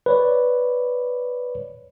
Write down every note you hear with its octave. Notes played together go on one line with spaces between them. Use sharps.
B4 C#5 D5